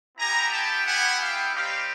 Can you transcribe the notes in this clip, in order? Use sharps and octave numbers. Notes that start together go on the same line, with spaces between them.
B3 E4 G4 G#5 A#5
G5 A5
F#5 G#5
F5 G5
G3 C4 D#4 G4 F5 G5